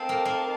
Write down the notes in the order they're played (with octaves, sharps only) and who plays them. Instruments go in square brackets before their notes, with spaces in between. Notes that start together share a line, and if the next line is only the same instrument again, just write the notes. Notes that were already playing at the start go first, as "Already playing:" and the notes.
Already playing: [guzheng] C4 [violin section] D#4 A#4 F5 A5
[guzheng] A#3
A#3